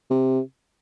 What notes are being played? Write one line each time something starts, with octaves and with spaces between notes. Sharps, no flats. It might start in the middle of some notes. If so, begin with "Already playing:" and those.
C3